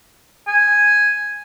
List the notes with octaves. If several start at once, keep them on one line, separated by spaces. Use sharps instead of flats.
G#5